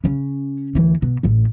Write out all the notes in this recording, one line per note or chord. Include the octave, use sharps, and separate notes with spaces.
C#3 C#4
D2 E3
B2
A1 A2